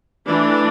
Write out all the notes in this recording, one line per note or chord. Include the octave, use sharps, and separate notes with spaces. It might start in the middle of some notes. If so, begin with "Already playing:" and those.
E3 A3 D4